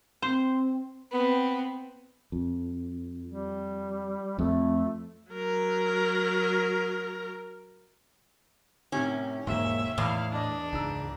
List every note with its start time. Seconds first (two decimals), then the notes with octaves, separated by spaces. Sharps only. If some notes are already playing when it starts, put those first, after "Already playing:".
0.22 C4 C5
1.11 B3 C4
2.32 F2
3.28 G3
4.39 F2 A3
5.32 F#3 A#4
8.92 A2 C3 D#3 C#4
9.47 E1 D#2 G#2 A#3 E5
9.98 E2 A2 E4 F5
10.32 D4 D#5 A5
10.73 C#2 G#2 E6